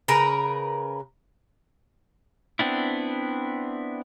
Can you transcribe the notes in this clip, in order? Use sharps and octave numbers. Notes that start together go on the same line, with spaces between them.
C#3 A#4 B4 A#5
B3 C4 D4 E4